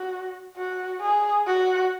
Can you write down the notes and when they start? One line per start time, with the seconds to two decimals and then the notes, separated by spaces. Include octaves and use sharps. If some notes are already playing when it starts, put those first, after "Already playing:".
Already playing: F#4
0.57 F#4
1.01 G#4
1.47 F#4